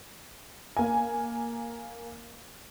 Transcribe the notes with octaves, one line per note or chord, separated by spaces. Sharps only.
A#3 G#5